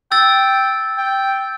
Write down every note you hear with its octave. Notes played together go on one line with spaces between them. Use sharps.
G5 E6 A6
G5